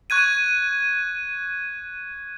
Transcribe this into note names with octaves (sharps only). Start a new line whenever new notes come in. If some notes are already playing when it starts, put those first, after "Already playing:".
C#6 F#6 G#6 D#7